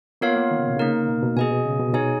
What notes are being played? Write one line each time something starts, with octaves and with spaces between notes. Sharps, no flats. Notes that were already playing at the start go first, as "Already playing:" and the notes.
A#3 B3 F4 A#4 C#5 F5
A#3
D#3
C#3
B2
C#3 A#3 D#4 A#4
B2
B2
B2 G#4 D#5 G#5
B2
C#3
B2
B2 D#4 G#4 C#5 G#5